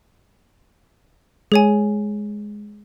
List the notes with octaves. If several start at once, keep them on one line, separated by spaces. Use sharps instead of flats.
G#3 G#4 C#5 G#5